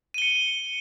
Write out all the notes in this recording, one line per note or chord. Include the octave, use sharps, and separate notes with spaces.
C#7 D#7 G7